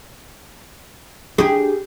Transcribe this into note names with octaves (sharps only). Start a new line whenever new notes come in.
D4 G4 G#4